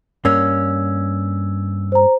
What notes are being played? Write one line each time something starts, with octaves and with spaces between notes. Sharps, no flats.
G2 A#3 C#4 E6
C5 A#5